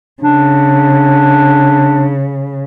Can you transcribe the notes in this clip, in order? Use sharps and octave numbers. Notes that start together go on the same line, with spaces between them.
C#3 D4